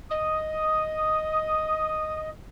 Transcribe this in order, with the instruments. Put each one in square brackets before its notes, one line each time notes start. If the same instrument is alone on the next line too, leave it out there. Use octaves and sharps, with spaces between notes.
[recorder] D#5 [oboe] D#6